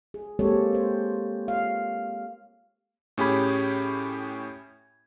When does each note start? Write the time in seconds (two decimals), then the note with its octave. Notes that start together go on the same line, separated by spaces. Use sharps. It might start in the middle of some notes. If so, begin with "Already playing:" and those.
0.14 G#4
0.39 G#3 A#3 C4 G4 A4 C#5
0.73 C4 C5
1.48 F5
3.18 A2 C#4 G4 G#4 B5 G#6